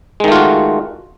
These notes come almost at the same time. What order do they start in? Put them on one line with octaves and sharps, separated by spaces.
G#3 D#3 A3 F4 F#4